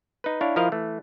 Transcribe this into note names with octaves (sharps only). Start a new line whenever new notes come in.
D#4 B4
D4 E4 C#5 F5
F3 E4 A#4 D#5 F5
E3 A3